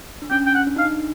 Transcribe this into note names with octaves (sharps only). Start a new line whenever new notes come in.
D4
C#4 G5
G5
F#5
D4
D#4 F5
D4